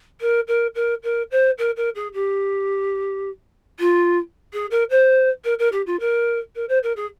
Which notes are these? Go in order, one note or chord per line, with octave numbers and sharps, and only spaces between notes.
A#4
A#4
A#4
A#4
C5
A#4
A#4
G#4
G4
F4
G#4
A#4
C5
A#4
A#4
G4
F4
A#4
A#4
C5
A#4
G#4